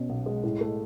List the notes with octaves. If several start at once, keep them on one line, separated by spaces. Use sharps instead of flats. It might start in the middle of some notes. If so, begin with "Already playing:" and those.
Already playing: B2 B3 C#4
B1
G#3
A2
A3